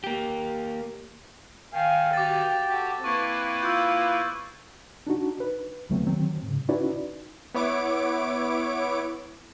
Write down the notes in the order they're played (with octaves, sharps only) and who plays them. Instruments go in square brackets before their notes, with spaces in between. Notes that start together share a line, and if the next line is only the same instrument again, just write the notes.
[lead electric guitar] A#3 G4
[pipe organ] D#3 [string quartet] F5 G#5 [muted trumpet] G5
[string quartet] F#4 G4 F5 [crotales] D6 A6
[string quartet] F#4 A4 [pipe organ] G4
[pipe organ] A#3 E4 B4 [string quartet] C4 [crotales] C#6
[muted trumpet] F4 [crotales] E6 G6
[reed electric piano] D4 D#4 F#4
B4
C#2 D3 F#3 A3 B3 C4
D#3 F#3 C4
G#2 C#3
C#4 D#4 E4 F#4 B4 D5
[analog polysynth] B3 E4 C#5 D6 D7